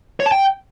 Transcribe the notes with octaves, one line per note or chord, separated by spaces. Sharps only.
C#5
A5
G5